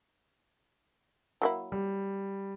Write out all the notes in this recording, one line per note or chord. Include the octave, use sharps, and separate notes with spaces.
F#3 A#3 E4
G3